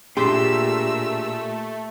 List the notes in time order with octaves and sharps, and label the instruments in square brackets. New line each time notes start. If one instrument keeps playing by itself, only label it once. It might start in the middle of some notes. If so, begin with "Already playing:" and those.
[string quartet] A#2 E6 [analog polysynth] A3 [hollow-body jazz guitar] D4 G#4 C6 [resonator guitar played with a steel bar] G4